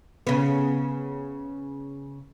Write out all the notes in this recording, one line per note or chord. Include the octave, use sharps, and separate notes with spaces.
C#3 B3